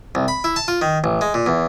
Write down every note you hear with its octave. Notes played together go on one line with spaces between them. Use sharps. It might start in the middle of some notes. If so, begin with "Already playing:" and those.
C2
B5
E4
A5
F4
D#3
A1
G#3
A#2
E2